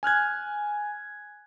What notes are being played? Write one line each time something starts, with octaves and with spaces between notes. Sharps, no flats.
G#5 F6 F#6 G#6